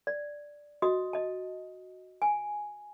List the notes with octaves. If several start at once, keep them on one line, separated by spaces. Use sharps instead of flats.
D5
F#4 D#5 D#6
D#5 A5
G#5